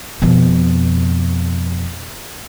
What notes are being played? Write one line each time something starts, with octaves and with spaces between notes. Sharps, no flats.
F2 B2